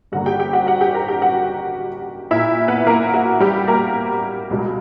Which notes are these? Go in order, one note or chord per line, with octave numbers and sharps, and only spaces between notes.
G2 D3 A#3 F#4 F#5
G4 G5
G4 G5
F#4 F#5
F#4 F#5
G4 G5
A#4 A#5
G4 G5
F#4 F#5
A#2 A#3 E4 E5
B3 B4
A#3 A#4
F#4
G3 G4
A#3 A#4
C#2 B2 G3